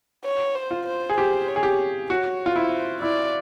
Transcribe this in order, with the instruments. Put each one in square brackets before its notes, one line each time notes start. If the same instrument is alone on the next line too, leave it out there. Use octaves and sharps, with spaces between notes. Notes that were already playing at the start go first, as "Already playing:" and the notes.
[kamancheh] C#5
C5
[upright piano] F4
[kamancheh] C5
[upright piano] G#4
[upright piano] G4 [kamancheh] C5
[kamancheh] C#5
[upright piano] G#4
G4
[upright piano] F#4 [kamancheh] C#5
[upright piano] F4
[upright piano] E4 [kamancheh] C5
[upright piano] E4 [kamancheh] D5